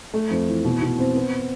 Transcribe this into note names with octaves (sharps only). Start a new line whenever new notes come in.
A3
F2
E3
B2
B2
C4
B3